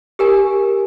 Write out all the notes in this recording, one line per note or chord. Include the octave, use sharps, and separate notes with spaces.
G4 A#4 G#5